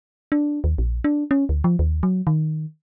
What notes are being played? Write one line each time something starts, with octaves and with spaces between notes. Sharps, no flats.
D4
D#2
A#1
D4
C#4
D2
F3
D#2
F#3
D#3